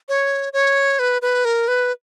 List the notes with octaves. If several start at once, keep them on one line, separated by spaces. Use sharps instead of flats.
C#5
C#5
B4
B4
A#4
B4